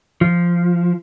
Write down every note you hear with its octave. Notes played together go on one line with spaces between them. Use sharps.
F3